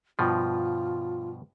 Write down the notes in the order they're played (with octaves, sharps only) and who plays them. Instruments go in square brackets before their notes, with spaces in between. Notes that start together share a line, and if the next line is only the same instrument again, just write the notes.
[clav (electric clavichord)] G2 B2 F3 [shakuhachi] F4